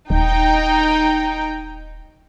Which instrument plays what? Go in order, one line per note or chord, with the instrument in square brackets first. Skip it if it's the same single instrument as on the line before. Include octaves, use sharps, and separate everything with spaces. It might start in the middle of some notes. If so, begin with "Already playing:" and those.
[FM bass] D#1 [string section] D#4 G5